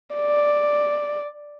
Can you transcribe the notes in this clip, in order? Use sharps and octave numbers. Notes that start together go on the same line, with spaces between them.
D5